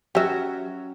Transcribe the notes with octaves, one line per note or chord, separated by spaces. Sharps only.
F#3 C#4 F#4 G4 E5